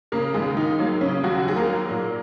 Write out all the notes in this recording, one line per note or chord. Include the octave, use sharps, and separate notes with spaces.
C#3 A#3 A#4
D#2 G#3 G#4
D#2 D#3 D#4
F#3 A#3
C#3 C#4
D#2 F#3 F#4
D#2 G#4
A#3 A#4
F#3
A#2